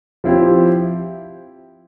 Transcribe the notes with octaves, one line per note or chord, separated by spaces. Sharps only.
F3 C4 E4 G4